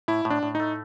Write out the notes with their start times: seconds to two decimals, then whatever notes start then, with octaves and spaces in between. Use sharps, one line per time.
0.08 A2 E4
0.25 A2
0.30 D4
0.43 A2
0.55 D#4
0.60 A3